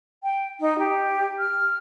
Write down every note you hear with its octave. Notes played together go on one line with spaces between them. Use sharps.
G5
D#4
G4
F6